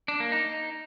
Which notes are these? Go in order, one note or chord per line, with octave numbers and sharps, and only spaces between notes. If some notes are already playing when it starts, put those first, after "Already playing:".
D4
A#3
D#4